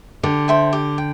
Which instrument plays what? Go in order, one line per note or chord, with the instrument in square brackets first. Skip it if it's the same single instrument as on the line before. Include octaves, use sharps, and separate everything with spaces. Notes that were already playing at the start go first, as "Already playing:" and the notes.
[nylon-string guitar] D3 [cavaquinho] G4
[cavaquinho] C5 E5 G5
G4
G5